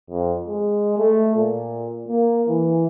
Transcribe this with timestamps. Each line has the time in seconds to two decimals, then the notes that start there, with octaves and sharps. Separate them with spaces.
0.10 F2
0.47 G#3
0.98 A3
1.36 A#2
2.08 A#3
2.48 E3